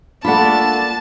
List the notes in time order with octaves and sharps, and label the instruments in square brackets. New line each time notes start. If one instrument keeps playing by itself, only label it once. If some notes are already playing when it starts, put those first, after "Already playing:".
[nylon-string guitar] A3 A#3 F4 [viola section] D4 [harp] F#5 B5 [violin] A5